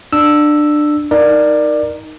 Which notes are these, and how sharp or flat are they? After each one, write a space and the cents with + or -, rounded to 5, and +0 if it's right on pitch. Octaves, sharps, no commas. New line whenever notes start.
D4 +20 E6 +0
D#4 +0 A#4 +5 D5 +20